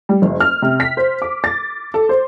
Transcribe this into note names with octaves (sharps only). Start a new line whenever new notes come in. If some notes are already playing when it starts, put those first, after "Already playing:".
G3
F#1
F6
C3
B6
C5
D6
A6
A4
C5